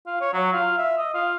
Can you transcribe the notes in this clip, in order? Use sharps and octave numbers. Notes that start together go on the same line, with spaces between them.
F4
C#5
F#3
F4
E5
D#5
F4